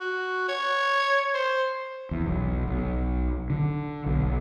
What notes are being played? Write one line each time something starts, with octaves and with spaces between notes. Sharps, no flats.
F#4
C#5
C5
E2
B1
B1
D3
B1